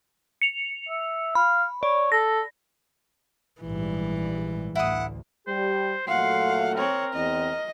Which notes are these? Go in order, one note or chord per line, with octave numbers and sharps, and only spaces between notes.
C#7 F7
E5
F5 B5
C#5 D5
A4 A#6
A#1 G#2 E3 G3
A1 D2 E4 F#5 D#6
G3 G4 C5
A#2 F#3 A3 F5 F#5 C6
C4 A#4 C#5
E2 C4 D#5